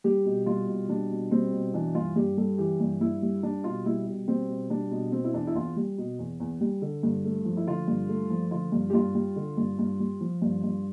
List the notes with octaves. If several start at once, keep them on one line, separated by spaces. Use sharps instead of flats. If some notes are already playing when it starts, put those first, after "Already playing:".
G3 G4
B2
G3 F4
B2
G3 D4
B2
G3 C4
B2
E3 D4
G2 F4
G2 G4
G3 A4
E3 G4
G2
G2 E4
G3
G3 D4
B2 F4
G3 E4
B2
G3 C4
B2
G3 D4
B2
B2 C4
E4
E2 D4
E4
E2 F4
G3
B2
E2
E2
G3
D3
G2
A3
F3
E4
D3 F4
G2
A3
F3
D3 F4
G2
G4
G2 F4
G3
D3
G2
G2
G3
F3
G2
G2